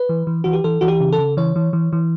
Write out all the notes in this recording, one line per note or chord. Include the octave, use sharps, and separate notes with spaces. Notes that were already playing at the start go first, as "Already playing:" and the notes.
Already playing: B4
E3
E3
E3 F#4
G4
E3 A4
E3 F#4
G4
C#3
A4
C#3
E3 C#5
E3
E3
E3